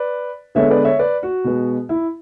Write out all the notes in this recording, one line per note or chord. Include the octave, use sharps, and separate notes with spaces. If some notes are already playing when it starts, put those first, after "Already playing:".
Already playing: B4 D5
D3 G#3 B3 C#5 E5
B4 D5
C#5 E5
B4 D5
F#4
B2 G#3 B3
E4